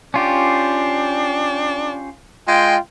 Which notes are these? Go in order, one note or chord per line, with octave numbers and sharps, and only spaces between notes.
C#4 D4 F4 G4
G#3 F4 G5